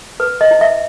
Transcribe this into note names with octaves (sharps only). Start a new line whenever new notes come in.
B4
D#5
E4
E5